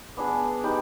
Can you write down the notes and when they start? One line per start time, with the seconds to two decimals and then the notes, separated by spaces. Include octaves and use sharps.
0.17 B3 D4 G#4 B4
0.63 D#4 G4 B4